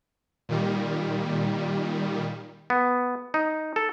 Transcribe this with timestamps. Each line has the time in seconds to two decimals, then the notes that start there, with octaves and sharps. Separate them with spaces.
0.49 A#2 D#3 G3
2.70 B3
3.34 D#4
3.76 A4